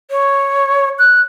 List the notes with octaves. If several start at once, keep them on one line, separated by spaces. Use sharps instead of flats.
C#5
F#6